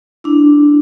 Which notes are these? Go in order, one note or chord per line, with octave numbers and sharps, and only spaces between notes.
D4 E4